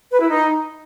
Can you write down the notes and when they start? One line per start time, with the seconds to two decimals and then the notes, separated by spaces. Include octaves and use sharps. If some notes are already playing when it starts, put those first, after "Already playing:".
0.11 B4
0.20 E4
0.29 D#4